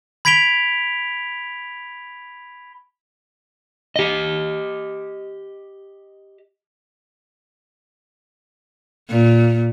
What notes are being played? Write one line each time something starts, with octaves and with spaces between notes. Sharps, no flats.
B5 G#6 B6 D7 F7 G7
G4 D#5
A#2